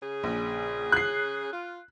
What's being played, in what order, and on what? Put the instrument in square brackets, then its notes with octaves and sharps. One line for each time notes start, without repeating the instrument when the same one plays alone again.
[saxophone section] C#3 G#4
[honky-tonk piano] A#1
F#6 C7
[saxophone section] F4